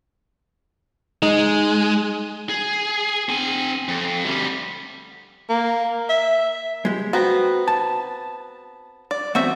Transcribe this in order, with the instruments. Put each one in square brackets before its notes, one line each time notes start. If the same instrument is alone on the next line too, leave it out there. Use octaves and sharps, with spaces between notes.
[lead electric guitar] G#3 [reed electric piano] D#4
[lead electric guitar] G#4
C4 G#5
F2
D2 G3
[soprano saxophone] A#3
E5
[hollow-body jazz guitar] G#3 G4
[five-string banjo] B3 C4 A#5 [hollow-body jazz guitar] F#4
[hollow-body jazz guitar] A5
[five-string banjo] D5
[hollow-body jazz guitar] E2 A3 C4 [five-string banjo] F#4 E5